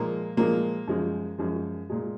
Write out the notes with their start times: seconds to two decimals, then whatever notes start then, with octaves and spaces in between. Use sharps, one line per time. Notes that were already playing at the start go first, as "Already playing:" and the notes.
Already playing: A#2 F3 G#3 A#3
0.37 A#2 F3 G#3 A#3
0.87 F#2 F3 G#3
1.38 F#2 F3 G#3
1.90 A#2 G#3